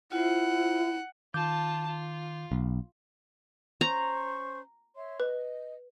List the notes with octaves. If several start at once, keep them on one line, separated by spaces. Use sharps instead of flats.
E4 F4 C5 F#5
D#3 F4 A5 D6 G6
F4
B1
C#4 C5 A#5 C#6
C#5 E5 C6
B4 D#5